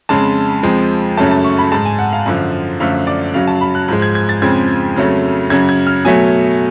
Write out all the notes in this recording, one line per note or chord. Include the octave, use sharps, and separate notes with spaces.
F2 C#3 G#3 A5
F2 F3 G#3
F#2 C#3 F#3 A3 A5
A5
C#6
B5
G#2 G#3 A5
G#5
F#5
F5
F#2 D3 F3
F#2 D3 F3 A3 F5
D5
F#2 C#3 F#3 F5
A5
B5
F#6
G#2 F3 G#3
G#6
G#6
A6
F2 C#3 F3 G#3 G#6
F2 C#3 F#3 A3
F#2 C#3 F#3 G#6
G#6
F6
B2 F#3 A3 G#5